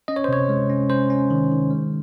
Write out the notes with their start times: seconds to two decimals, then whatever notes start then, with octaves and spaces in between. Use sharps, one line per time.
0.08 C#4 D#5
0.16 C#5
0.24 C5
0.29 C3 C#5
0.49 G#3
0.70 C#4
0.89 C#4 C5
1.10 C#4
1.30 D#3
1.51 D#3
1.71 G#3